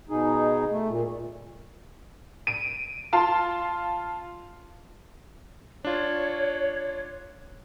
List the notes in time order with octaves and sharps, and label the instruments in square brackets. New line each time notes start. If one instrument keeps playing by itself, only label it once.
[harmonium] B2 D#4 G#4
A3
A#2
[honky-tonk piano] D7 D#7
F4 A5 C6
[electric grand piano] D4 F4 [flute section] C#5